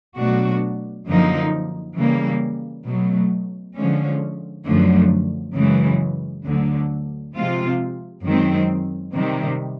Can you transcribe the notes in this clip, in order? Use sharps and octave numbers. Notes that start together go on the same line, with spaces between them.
B2 F#3 A3 D4 F#4
F#2 D3 F3 A#3 D#4
C#3 E3 G3 A#3
B2 F#3 A3
D3 F3 G#3 C#4
F#2 D3 F3 A3
F#2 C#3 E3 G#3
D2 D3 F#3
C3 F3 G#3 C4 F4
F#2 D#3 G#3 C4
C3 D#3 G3